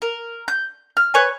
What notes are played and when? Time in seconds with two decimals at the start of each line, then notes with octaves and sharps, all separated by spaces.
0.02 A#4
0.48 G6
0.97 F6
1.14 B4 C#5 G#5